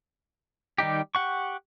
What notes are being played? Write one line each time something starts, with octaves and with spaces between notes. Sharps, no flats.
D#3 G3 D#4 G4
G4 F#5 C#6